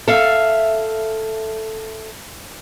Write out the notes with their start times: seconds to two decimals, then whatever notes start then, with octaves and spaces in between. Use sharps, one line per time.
0.08 A4 E5 F5